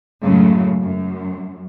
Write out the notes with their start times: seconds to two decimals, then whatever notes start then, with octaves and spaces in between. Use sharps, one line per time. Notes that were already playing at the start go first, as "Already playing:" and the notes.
0.22 F#2 A2 C#3 F#3 G#3
0.82 F#2